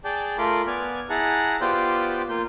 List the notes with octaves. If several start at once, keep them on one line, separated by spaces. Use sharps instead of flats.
G#4 D5 G5 A5
A3 F4 A#4 B5 C6 D6
B3 D5 G#5 F6
E4 G#4 F#5 A5 A#5
B3 F4 G4 C5 D5 G5
A#3 F4 G6